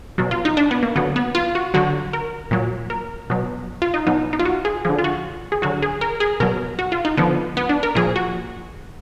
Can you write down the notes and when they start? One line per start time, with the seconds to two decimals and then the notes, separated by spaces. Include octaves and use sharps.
0.18 B2 F#3 F#4
0.31 F4
0.45 D#4
0.57 D4
0.71 B3
0.83 A#3
0.96 D3 F#3 B3
1.16 B3
1.35 F4
1.55 F#4
1.74 D3 F#3 F#4
2.13 A#4
2.51 A#2 F#3
2.90 A#4
3.30 B2 F#3
3.82 F4
3.94 D#4
4.07 B2 F#3 D#4
4.33 D#4
4.40 F4
4.45 F#4
4.65 G#4
4.85 D3 F3 G#4
4.98 F4
5.04 F#4
5.52 G#4
5.62 D3 F#3 F#4
5.82 G#4
6.01 A#4
6.20 G#4
6.40 B2 F#3 A#4
6.79 F#4
6.92 F4
7.05 D#4
7.18 D3 F3 B3
7.57 B3
7.69 D4
7.83 A#4
7.95 A#2 F3 G#4
8.16 F#4